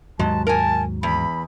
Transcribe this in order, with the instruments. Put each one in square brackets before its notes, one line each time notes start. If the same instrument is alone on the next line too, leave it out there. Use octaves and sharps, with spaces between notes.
[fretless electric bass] D#2 G#2 F#3 [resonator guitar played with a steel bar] G#3 [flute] A5
[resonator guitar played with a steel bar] A#4 G#5 [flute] A5
[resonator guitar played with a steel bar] E2 [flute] B5